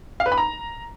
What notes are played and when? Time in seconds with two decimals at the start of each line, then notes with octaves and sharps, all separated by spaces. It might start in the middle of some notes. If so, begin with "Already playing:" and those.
0.20 F5
0.26 B4
0.32 B5
0.38 A#5